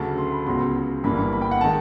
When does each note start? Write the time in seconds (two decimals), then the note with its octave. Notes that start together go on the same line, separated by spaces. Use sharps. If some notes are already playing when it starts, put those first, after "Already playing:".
Already playing: D2 C#3 F#3 A5
0.18 C6
0.32 B5
0.46 C#2 C#3 F#3 B3 C6
1.03 G1 G2 E3 G3 A#3 B5
1.33 B5
1.41 G5
1.51 F#5
1.61 D#3 G#3 A5